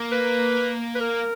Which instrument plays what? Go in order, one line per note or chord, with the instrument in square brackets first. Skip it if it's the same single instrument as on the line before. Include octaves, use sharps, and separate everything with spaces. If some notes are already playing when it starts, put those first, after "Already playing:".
Already playing: [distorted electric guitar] A#3
[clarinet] B4
B4
A#4